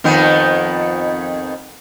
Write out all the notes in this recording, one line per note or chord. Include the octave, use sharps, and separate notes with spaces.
F2 D#3 B3